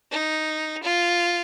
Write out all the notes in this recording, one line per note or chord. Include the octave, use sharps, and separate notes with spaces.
D#4
F4